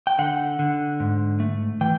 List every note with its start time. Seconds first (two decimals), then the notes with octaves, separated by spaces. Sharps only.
0.07 G5
0.19 D3 F#5
0.59 D3
1.00 G#2
1.40 A3
1.81 E3 G5